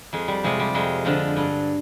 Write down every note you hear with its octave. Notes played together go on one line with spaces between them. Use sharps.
F2 G#3
G3
C3 F3 G#3
G3
F2 G#3
D3 F3
G2